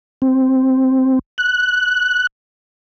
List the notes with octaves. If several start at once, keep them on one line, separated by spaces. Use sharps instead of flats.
C4
F#6